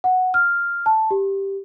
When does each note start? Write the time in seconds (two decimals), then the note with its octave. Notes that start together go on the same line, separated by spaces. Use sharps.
0.04 F#5
0.34 F6
0.86 A5
1.11 G4